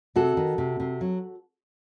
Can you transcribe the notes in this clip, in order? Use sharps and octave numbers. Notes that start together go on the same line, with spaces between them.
C3 F#4 A4
D#3
C3
C3
F#3